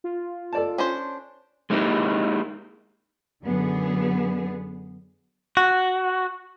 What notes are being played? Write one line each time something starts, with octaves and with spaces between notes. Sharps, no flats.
F4
A4 D5 A5
C#4 D4 C5
G#3 A#3 D#4 E4 G4 A#4
F#2 D3 B3 G#4
F#4